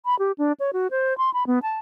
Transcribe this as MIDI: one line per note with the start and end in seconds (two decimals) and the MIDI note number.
0.05 0.18 83
0.19 0.32 67
0.38 0.52 62
0.60 0.71 73
0.73 0.87 66
0.91 1.16 72
1.18 1.33 84
1.34 1.46 83
1.47 1.59 59
1.62 1.79 81